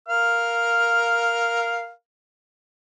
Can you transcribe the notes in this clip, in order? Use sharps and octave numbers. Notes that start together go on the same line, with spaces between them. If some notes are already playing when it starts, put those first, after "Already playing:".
A#4 F5 F6